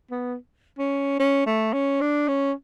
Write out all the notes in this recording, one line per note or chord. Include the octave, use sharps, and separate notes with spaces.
B3
C#4
C#4
A3
C#4
D4
C#4